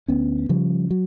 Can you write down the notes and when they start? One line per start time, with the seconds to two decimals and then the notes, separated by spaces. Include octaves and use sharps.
0.08 D2 B3 C#4
0.49 C#3 F3 G3
0.91 F#3